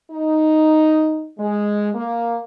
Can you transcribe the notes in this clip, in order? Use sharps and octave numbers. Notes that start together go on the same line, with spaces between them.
D#4
G#3
A#3